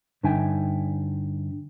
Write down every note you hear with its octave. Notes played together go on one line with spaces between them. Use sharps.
G2 D3 D#4 E5 G5 G#5